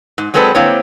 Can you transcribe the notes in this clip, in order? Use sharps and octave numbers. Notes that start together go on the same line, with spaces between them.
G#2
F#3 G#3 C4 A4 B4 D5
D3 A#3 C4 E4 C#5